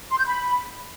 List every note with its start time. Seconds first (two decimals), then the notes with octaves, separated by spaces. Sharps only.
0.10 C6
0.18 G6
0.26 B5